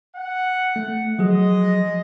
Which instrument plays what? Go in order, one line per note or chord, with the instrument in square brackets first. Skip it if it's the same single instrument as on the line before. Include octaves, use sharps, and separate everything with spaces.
[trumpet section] F#5
[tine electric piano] A3
[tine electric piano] F3 F#3 G#4 [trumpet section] G#3 D#5